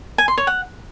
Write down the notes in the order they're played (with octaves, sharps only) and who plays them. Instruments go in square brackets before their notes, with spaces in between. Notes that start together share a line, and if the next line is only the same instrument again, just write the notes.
[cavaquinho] G#5
C6
C#5
F#5